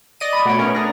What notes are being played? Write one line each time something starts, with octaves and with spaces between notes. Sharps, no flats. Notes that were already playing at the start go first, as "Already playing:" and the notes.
D5 D#5 D#7
B5
B2 A3 C#5 F#5 D7
B3 C#4 A#4
D4 G#4 A#5 A6 A#6